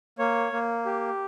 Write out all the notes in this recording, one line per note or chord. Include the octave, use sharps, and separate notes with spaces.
A#3 C#5
A#3
G4